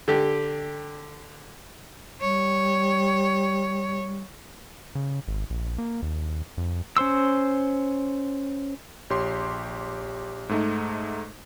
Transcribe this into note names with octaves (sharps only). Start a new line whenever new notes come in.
D3 G4
G3 C#5
C#3
G#1
A#1
A#3
D#2
F2
C#4 C5 C6 E6
A#1 G4 C#5 C6
G#2 A3 D#4